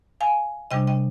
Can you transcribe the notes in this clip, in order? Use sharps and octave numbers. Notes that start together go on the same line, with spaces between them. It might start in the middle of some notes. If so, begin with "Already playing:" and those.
F5 G#5
C3 G3 D4 D#5 G5
D#5 G5